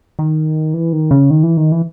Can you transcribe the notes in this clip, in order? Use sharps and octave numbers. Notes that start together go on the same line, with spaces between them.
D#3
E3
D#3
C#3
D#3
E3
D#3
E3